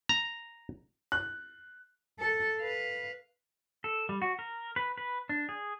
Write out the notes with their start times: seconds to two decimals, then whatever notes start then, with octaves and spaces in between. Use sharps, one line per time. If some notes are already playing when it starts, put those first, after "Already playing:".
0.09 A#5
1.12 F#6
2.19 A4
2.60 B4 F5
3.84 A4
4.09 G3
4.22 F#4
4.39 A#4
4.76 B4
4.98 B4
5.29 D4
5.49 G#4